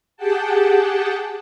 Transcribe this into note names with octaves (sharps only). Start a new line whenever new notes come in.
G4 G#4 F#5 G5 A5